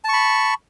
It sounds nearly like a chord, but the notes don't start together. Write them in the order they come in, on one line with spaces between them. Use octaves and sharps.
A5 C#6 B5